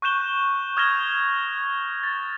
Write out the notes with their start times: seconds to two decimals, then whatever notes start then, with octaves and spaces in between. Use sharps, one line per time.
0.02 C#6 F#6 G6 E7 G7
0.77 D#6 F6 G#6 A#6 E7 G7
2.03 A6